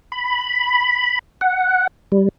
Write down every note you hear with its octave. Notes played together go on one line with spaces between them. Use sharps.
B5
F#5
G3